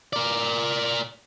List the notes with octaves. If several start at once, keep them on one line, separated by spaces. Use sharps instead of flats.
A#4 D5